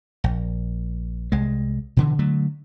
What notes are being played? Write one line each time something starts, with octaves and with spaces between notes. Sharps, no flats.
A#1
C2 G#3
B2 D3 E3
D3 F#3 A3